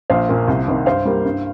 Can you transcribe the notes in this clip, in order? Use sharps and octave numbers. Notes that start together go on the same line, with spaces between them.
A#1 C5 F5
A#2 F3 A#3
C2
C3 D#3 C4
G2 C5 F5
G3 A#3
G2